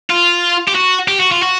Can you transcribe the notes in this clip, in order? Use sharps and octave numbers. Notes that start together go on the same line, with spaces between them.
F4
G4
F#4
G4
F#4
F4
F#4